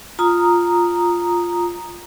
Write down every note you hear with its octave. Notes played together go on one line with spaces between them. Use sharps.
F4 A#5 D#6